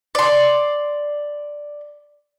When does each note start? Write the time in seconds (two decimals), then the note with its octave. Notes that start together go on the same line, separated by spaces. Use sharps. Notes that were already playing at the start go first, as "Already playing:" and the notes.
0.15 D5 C6